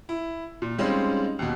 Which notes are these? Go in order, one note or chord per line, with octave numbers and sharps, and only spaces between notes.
E4
A#2
G3 G#3 C4 C#4 D#4 F4
D#2 B2